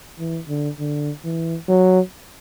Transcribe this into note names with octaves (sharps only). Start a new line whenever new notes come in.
E3
D3
D3
E3
F#3